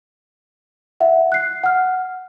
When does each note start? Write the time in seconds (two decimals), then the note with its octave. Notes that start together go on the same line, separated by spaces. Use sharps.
1.00 E5 F#5
1.32 F#6 C7
1.64 F#5 F6